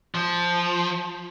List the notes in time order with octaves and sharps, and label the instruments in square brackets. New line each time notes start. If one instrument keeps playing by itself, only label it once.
[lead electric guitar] F3